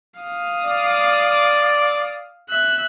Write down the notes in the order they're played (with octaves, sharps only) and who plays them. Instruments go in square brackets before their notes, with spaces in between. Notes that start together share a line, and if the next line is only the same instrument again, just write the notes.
[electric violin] F5 D#6
[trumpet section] D5
[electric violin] E5 F#6